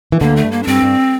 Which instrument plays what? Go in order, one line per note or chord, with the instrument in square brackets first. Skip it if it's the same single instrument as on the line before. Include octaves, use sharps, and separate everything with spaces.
[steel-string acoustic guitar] E3
[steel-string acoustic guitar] D2 D3 [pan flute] A#3
[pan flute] A3
[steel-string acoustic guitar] G2
[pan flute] A#3
D4
[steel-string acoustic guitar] G2 [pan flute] C4
[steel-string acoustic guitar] G2